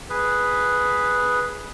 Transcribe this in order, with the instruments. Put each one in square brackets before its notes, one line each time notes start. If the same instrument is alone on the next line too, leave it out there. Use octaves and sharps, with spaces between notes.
[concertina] G#4 B4